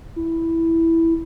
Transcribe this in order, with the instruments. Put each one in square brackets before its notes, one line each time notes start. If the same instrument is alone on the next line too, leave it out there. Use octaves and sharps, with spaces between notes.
[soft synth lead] E4